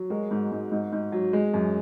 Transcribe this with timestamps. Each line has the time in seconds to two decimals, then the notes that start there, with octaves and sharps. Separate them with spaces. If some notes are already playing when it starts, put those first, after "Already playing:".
Already playing: F#3
0.10 G#3 F#4 A#4
0.31 G#2
0.52 G#2
0.72 G#2
0.92 G#2
1.12 F#3
1.33 G#3
1.54 F#2